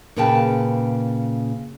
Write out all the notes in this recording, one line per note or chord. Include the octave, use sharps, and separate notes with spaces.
A#2 C#3 B4 G5 A5